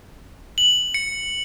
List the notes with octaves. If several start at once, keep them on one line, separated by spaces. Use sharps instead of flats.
F#7
C#7